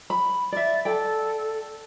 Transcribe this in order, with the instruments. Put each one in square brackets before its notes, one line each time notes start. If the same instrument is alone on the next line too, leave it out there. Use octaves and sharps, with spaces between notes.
[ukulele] B5
[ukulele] D5 E5 [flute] A6
[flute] A4 [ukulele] D5 G5